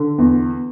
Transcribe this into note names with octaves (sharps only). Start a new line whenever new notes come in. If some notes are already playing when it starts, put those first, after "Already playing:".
Already playing: D3
E2